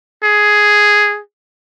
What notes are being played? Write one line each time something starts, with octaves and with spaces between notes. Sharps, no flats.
G#4